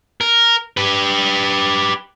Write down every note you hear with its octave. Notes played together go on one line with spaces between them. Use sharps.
A#4
G4 B4